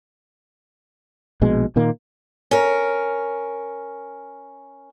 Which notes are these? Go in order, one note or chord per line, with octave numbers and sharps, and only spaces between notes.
A#1 B2 G#3
A#2 D#3 A#3
C#4 A#4